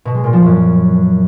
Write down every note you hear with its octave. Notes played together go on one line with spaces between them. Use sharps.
B2
G#3
A#2
F3
F#2